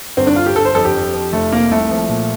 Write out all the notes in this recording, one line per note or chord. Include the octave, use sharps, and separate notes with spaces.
G1 C4
D4
G1 F4
G4
G1 A4
C5
F2 A4
G4
F2
F3
F1 A3
C3 A#3
C2 A3
F3
A#2